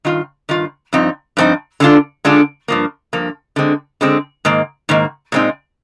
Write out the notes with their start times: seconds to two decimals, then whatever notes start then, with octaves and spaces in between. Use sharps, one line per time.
0.05 G2 D#3 F4
0.49 G2 D#3 F4
0.93 G2 F3 C4 D#4
1.37 G2 F3 C4 D#4
1.80 D3 G#3 D4 F4
2.25 D3 G#3 D4 F4
2.68 G2 F3 A#3
3.13 G2 F3 A#3
3.56 D3 G#3 C4
4.01 D3 G#3 C4
4.45 G#2 D#3 A#3
4.89 G#2 D#3 A#3
5.32 A#2 G#3 C4 D#4